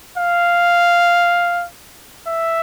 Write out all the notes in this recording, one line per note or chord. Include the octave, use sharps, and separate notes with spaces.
F5
E5